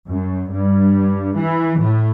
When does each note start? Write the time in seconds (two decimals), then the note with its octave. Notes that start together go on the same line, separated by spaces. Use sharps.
0.08 F#2
0.51 G2
1.37 E3
1.79 A2